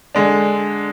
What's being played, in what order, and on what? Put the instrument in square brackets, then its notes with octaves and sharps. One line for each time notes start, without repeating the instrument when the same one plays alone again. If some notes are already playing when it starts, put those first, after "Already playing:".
[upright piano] D3 G#3 D4